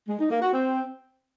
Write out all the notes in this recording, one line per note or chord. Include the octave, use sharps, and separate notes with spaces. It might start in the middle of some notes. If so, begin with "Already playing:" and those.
G#3
D#4
A#3
F#4
C4